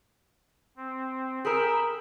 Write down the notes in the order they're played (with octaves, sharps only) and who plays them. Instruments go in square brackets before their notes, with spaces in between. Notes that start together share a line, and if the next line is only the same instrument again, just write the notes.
[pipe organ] C4
[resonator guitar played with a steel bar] G#4 A#4 [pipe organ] G5 B5 E6